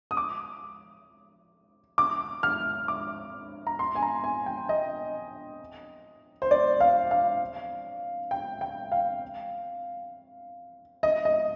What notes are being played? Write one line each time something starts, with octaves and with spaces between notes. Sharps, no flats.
D#6
D6
D6
F6
D6
A#5
C6
G#5
A#5
G#5
G5
D#5
C5
D5
F5
F5
G5
G5
F5
D#5
D#5